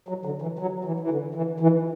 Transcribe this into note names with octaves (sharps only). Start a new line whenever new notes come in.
F#3
D3
E3
F#3
E3
E3
D3
E3
E3